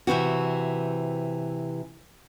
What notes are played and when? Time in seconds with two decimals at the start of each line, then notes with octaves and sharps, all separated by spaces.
0.07 C3 E3 C4 F#4